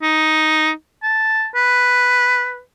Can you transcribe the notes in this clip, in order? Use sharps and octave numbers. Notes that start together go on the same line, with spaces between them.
D#4
A5
B4